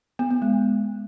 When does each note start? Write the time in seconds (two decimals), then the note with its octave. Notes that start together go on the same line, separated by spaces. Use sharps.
0.19 B3
0.31 B3
0.42 G#3